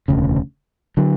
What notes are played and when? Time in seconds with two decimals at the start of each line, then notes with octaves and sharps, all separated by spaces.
0.08 E1 D2 C#3
0.97 D3 F#3